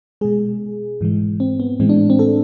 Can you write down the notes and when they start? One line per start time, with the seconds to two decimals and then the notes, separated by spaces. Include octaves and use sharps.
0.21 B2 G#3 G#4
1.01 G#2 E3 G#3
1.40 C4
1.60 B3
1.80 A2 E3 G#3 C4
1.89 D4
2.10 C4
2.19 A4